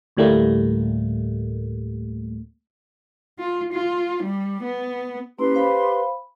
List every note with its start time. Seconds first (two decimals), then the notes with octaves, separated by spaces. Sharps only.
0.17 D2 A2 G3 A3 A#3
3.39 F4
3.73 F4
4.24 G3
4.63 B3
5.39 A#3 C#4 E4 G4 B4 C6
5.55 C5 F5 B5